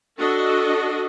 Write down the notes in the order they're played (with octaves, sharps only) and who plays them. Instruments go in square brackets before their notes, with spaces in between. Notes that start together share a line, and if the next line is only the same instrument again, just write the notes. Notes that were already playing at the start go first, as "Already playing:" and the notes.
[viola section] D4 F#4 A4 D#5